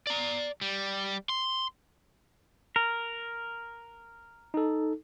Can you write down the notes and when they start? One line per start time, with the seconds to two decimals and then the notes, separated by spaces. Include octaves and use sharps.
0.07 D5 A#5
0.61 G3
1.29 C6
2.76 A#4
4.54 D#4 A4